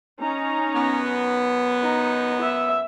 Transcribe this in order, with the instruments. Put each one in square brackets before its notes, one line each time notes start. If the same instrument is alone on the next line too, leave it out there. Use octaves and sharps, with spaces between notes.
[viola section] C#4 D#4 A#5
[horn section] F#2 B3
[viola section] D#4
E5